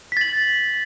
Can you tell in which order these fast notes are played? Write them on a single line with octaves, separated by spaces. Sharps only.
B6 A6 F#7